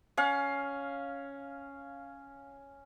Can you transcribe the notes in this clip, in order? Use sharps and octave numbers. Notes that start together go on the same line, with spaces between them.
C#4 F5